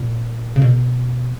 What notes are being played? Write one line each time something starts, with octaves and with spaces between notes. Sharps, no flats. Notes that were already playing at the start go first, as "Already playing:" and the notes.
Already playing: A#2
C#3
B2